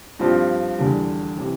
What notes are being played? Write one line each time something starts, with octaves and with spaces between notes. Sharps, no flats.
G2 F3 C4 F4
E2 D3 G3
C3 E3